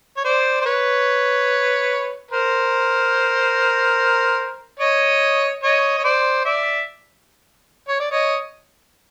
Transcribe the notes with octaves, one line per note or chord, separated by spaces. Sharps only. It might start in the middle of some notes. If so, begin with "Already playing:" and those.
C#5
C5 D5
C5
B4 C#5
A#4 C5
C#5 D#5
C#5 D#5
C#5
C5 D5
D5 E5
C#5
D5
C#5 D#5